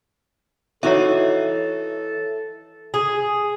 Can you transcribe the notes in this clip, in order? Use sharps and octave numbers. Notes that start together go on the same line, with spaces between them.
E3 D#4 F#4 A4 C#5 E5
G#4